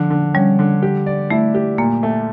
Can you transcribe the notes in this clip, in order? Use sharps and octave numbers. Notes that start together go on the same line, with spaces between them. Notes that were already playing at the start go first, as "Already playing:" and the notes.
Already playing: D3 F3
D3
G3 C#4
D3
G4
D5
A3 E4
G4
A#2 A#3
A3